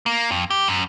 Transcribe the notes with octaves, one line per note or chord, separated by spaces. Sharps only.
A#3
F2
G4
F#2